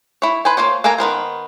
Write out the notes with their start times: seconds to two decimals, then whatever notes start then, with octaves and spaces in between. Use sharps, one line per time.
0.22 E4 C#5
0.45 B4 C5 G#5
0.57 A#3 F4 C5 C#5
0.84 A#3 A4 A#4 G#5 A#5
0.98 D#3 B3 A#4 C5